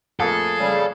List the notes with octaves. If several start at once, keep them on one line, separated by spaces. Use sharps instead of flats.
F2 A3 A#3 G#4 A4
C#3 G3